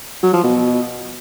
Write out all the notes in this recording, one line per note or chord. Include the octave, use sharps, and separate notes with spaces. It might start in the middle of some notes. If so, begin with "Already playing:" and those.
F#3
F3
B2